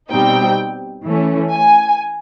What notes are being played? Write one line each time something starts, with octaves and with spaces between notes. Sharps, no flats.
B2 G3 C4 D#4 G5
E3 A3 C#4
G#5